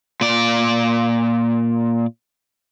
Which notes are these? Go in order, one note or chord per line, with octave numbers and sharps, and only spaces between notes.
A#2 D5